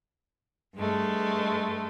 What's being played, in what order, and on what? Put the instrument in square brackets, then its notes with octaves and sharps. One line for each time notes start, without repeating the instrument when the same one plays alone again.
[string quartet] G2 G#3 A3